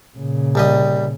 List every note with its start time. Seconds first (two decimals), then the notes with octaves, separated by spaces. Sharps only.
0.17 A#2 C#3
0.55 C2 G3 D#5